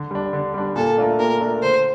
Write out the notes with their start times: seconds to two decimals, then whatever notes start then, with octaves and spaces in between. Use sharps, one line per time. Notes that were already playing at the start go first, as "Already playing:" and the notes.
Already playing: D3
0.11 G3 D4
0.33 D3
0.54 G3 D4
0.76 A#2 A4
0.97 A3 D4 F4 A#4
1.19 A#2 A#4
1.41 A3 D4 F4 A#4
1.63 D3 C5